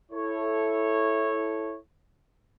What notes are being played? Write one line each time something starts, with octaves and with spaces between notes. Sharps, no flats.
E4 A4 C#5